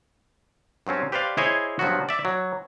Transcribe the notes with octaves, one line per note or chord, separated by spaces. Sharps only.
G2 F#3 C4 C#4
G4 B4 C5 D5 F5
E4 G#4 C5 C#5 D#5 G#5
G2 F3 F#3 B3 F#4
D5 E5
F#3